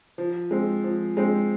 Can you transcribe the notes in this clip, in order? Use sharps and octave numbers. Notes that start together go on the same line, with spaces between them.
F3
G#3 C4
F3
G#3 C4